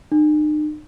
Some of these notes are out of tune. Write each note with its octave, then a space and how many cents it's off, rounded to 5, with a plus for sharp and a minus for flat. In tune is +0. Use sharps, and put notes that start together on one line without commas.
D#4 -45